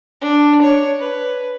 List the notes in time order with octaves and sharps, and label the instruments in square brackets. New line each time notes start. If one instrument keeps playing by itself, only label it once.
[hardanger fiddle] D4
C#5
B4